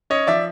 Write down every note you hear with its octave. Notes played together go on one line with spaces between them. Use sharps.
C#4 C#5 D#5
F3 D5 E5